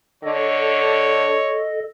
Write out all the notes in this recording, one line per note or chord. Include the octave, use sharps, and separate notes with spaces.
D3 A4 C#5 D#5